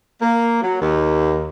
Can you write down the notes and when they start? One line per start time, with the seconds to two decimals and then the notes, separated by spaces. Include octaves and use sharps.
0.21 A#3
0.62 F#3
0.81 D#2